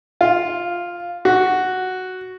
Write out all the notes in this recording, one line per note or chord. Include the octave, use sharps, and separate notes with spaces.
F4
F#4